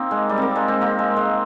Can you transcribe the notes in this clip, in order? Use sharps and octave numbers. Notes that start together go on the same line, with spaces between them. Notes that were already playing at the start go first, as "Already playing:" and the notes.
Already playing: A#3 C4 D#4
G#3
G3
A#3 C4
G#3
C4
A#3
G#3
G#3